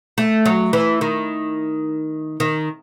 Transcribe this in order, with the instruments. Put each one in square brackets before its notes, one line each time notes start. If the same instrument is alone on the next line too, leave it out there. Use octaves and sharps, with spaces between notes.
[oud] A3
F#3
E3
D#3
D#3